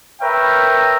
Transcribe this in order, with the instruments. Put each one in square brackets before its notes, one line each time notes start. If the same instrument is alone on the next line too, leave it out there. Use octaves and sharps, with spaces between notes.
[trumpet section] A#4 B4 C#5 E5 G5